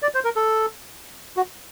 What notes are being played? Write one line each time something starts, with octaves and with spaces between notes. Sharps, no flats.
D5
C5
A#4
A4
F#4